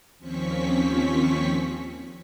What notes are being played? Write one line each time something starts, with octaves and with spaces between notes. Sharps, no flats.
D#2 F3 C4 C#4 C#6 B6